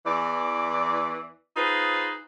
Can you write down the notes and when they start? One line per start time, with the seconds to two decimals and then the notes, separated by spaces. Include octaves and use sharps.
0.05 E2 E3 D5
1.57 D#4 F4 G#4 B4 C5